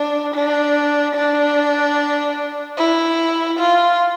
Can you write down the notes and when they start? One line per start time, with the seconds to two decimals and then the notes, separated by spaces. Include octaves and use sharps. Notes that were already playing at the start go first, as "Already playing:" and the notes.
Already playing: D4
0.35 D4
1.15 D4
2.78 E4
3.59 F4